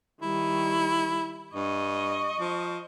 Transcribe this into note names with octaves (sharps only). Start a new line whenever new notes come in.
D#3 G3 E4
G2 D#5 C#6
F3